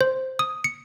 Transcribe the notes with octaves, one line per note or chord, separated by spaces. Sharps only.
C5
D#6
C#7